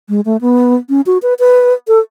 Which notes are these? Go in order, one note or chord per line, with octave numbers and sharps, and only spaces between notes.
G#3
A3
B3
C#4
F#4
B4
B4
A4